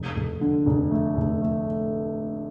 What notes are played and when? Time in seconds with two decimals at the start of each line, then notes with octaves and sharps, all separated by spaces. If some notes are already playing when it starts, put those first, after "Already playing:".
Already playing: F1
0.16 F1
0.41 D3
0.66 F1
0.91 A3
1.16 F1
1.41 A3